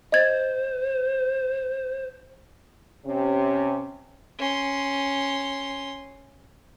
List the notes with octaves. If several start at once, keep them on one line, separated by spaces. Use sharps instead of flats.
C5 D#5 G#6 A6
C3 C#4
C#4 C6